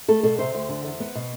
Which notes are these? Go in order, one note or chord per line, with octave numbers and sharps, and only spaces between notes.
A3 A4
B2 A4
C3 C5
D2
D3
E2
B3
B2